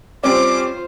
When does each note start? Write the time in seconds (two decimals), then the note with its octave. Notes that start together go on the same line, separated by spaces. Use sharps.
0.23 G3 C4 C#4 F4 C5 D6